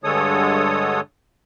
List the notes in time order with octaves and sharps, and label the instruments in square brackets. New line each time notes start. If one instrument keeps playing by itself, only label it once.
[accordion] G2 D3 G#3 A4 C#5 D#6